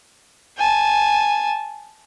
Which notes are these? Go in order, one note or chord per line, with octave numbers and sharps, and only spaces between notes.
G#5 A5